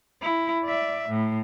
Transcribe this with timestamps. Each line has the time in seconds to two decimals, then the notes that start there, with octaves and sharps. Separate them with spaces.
0.22 E4
0.64 D5 E5
1.09 A2